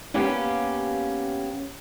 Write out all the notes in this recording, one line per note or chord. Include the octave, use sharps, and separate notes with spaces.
A#3 B3 C#4 G4 F5 G5